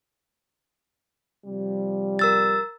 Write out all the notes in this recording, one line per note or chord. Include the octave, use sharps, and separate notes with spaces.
C3 F3 G3
A#4 E6 A6